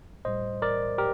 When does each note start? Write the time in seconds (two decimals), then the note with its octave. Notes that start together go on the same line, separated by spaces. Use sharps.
0.25 A2 G3 C5 D#5
0.62 A#4 D5
0.98 G4 A#4